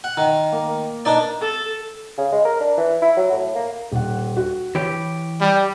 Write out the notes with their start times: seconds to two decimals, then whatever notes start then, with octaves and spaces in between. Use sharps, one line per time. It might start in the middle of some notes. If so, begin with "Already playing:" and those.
0.04 F#5
0.17 D#3
0.52 A#3
1.05 D4 D#4 B4 D5
1.41 A4
2.18 C#3
2.32 G#3
2.45 A#4
2.61 D4
2.78 E3
3.02 E4
3.17 F#3
3.32 A2
3.55 A#3
3.92 D#1 F#5
4.37 F#4
4.75 E3 G4 C#5
5.41 G3